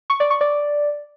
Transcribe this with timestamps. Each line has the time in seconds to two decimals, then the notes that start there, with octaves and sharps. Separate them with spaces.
0.10 C#6
0.20 D5
0.30 C#6
0.41 D5